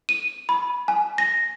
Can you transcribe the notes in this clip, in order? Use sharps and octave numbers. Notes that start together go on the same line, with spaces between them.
D#7
B5
G#5
A#6